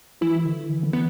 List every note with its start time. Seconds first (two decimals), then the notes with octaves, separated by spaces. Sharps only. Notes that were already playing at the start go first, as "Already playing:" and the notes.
0.21 E3 E4
0.45 D3
0.69 E3
0.83 D3
0.92 E3 B3